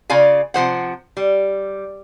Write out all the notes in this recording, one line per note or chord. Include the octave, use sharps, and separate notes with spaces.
C#3 F4 D5 F5 G#5
C3 F3 C5 F#5
G3